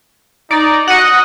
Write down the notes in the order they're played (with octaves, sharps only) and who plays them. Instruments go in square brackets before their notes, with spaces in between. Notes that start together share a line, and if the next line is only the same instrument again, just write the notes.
[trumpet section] D#4 [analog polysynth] D5
[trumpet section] F#4 [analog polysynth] D#5 F#5